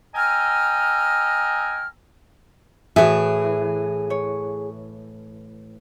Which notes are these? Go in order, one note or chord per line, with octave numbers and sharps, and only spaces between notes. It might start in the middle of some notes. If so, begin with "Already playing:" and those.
D#5 G5 G#5 A#5 E6 F6
A2 E3 F#4 G#4 B4 E5
C#5